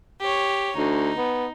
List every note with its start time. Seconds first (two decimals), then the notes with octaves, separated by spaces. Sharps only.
0.20 G4 C#5
0.77 D2 D#4
1.17 B3